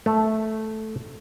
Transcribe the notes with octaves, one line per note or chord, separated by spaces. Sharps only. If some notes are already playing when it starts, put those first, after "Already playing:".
A3